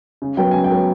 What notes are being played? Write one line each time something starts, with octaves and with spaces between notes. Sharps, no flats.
C#3
F#3 B3 G5
C#3 G#5
G5
F#3 B3